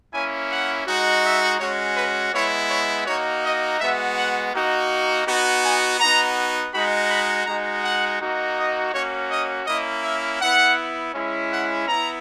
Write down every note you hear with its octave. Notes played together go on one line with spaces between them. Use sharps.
A#3 C#4 E4 G#5
F#5
G#3 D#4 F#4
E5
G#3 C#4 F#4 C#5
B4
G#3 B3 E4 C#5
C#5
A#3 D#4 F#4 C#5
D#5
G#3 B3 F#4 E5
F#5
A#3 D#4 F#4
B3 D#4 F#4
G#5
B3 D#4 F#4 A#5
G#3 D#4 F#4 B5
B5
G#3 D#4 F#4 A#5
F#5
A#3 D#4 F#4
D#5
A#3 C#4 F#4 C#5
D#5
A#3 C#4 E4 D#5
E5
B3 E4 F#5
G#3 C#4 E4
F#5
B3 E4 A#5